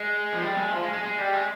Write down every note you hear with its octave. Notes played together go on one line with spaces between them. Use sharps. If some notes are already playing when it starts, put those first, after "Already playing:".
Already playing: G#3
F3
G3
G#3
F3
G#3
G#3
G#3
G3
G#3